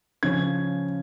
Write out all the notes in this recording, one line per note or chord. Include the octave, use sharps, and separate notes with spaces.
C#3 F3 C#4 G#6